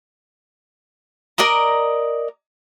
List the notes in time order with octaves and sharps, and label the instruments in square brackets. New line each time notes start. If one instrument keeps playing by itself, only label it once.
[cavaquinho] A#4 D5 D#5 A#5